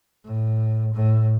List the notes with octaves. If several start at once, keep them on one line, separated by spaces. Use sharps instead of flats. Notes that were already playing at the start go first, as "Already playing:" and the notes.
A2
A2